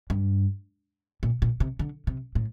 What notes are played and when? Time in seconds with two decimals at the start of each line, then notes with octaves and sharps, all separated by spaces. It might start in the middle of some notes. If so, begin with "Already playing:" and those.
0.10 G2
1.23 A#2
1.42 A#2
1.60 C3
1.79 D3
2.07 C3
2.35 A2